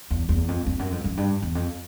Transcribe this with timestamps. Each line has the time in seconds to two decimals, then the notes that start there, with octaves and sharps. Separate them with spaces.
0.11 E2
0.29 E2
0.48 F2
0.66 F2
0.79 F#2
0.92 F2
1.04 F#2
1.17 G2
1.42 E2
1.55 F2